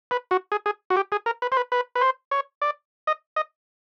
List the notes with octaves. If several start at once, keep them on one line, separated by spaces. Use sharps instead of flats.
B4
F#4
G#4
G#4
F#4
G4
G#4
A#4
B4
C5
B4
B4
B4
C5
C#5
D5
D#5
D#5